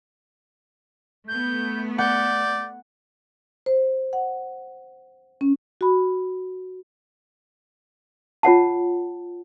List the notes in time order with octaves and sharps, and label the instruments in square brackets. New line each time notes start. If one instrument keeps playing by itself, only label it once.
[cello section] A3 B3 [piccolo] G6
[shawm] D5 [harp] F#5 [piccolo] G6
[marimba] C5
F#5
C#4
F#4 B5
[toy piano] F4 C#5 F#5 A5